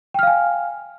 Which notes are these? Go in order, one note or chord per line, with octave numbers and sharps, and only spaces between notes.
F5 G5 G#5 F6